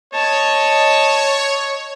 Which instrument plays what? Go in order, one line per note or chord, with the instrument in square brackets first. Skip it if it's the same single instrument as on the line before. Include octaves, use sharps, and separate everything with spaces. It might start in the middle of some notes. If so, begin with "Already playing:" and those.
[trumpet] C#5 [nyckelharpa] D#5 A5